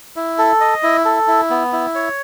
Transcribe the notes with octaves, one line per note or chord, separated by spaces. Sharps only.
E4
A4
D#5
E4
A4
E4
B3
E4
C#5